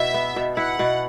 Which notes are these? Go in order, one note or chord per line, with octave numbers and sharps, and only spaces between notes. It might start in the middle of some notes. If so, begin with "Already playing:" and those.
Already playing: B2 E4 E5
B3
B2
E4 F#5
B2